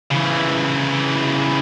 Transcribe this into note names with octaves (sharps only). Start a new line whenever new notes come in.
C#3 E3